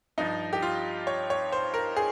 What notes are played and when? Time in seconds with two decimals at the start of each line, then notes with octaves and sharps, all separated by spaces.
0.18 G2 F3 D#4
0.53 G4
0.62 F4
1.07 C#5
1.30 C#5
1.52 C5
1.74 A#4
1.97 G#4